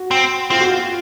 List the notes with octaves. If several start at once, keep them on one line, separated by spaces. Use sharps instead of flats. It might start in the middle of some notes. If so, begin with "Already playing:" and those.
Already playing: F#4
C4
C4 F4
F#4
F4